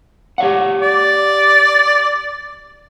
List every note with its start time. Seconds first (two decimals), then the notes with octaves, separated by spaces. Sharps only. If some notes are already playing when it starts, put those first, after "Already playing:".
0.38 G4 C#5 F#5
0.82 D5